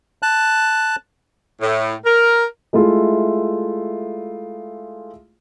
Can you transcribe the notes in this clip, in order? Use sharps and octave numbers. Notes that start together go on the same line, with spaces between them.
A5 F#6
A2
A#4
G#3 A3 E4 F4